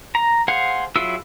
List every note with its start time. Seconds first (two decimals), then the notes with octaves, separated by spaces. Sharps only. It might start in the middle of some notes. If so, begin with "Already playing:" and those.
0.15 A#5
0.48 G#4 C5 F5 F#5
0.96 F#3 E4 F4 G#4 E6